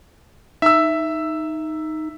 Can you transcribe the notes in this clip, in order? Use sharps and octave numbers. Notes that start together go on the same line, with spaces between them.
D#4 E5 E6